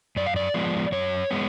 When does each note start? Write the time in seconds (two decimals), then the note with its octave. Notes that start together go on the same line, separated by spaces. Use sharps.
0.16 F#2 D5
0.27 F5
0.36 D5
0.54 F3 G#3 B3
0.92 F#2 C#5
1.31 G#3 B3